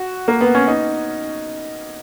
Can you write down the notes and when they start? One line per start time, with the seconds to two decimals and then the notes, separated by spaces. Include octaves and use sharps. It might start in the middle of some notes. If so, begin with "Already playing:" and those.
Already playing: F#4
0.28 A#3
0.41 B3
0.55 C#4
0.68 D#4